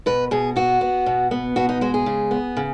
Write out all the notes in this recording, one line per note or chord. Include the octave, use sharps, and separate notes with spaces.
B2 B4
B2 G#4
B3 F#4
B3
B2
B3
B2 F#4
D#4
G#3 F#4
G#4
C#3
B3
C#3